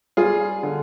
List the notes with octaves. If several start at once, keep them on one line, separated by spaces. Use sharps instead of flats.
G3 F4 G#4
D3